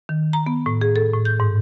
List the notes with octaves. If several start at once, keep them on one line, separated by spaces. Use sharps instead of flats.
D#3
A#5
B3
A2
G#4
A4
A2
G6
G#2